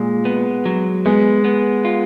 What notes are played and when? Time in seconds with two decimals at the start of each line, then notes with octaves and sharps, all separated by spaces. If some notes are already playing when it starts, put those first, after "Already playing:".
Already playing: A#2 G#3
0.25 B3
0.65 F#3
1.06 G#3 B3
1.45 B3
1.85 F4